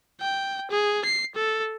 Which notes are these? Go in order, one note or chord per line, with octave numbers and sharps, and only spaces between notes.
G5
G#4
C7
A4